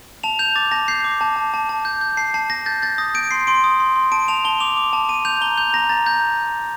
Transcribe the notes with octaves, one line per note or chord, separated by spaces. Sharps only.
A5 F7
G6 F7
D6 A6
A5 A#6
G6 C7
D6
A5
A5
A5
A5
G6
G6
A5 C7
A5 C7
A5 A#6
G6 A6
G6 A6
D#6 A#6
G6 D7
C6 C7
C6 D7
D#6
C6
C6
A5 D7
A5 F7
A5 G7
D6 F7
D6
A5
A5 D#7
G6 F7
A#5 G7
G6 F7
A#5 A#6
A#5 A6
A#5 G6